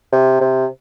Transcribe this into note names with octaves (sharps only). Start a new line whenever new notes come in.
C3
C3